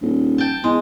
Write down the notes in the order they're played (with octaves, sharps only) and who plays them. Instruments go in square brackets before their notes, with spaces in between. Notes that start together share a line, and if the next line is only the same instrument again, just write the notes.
[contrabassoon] D#1
[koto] G5 A5
[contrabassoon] E2 [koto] G#3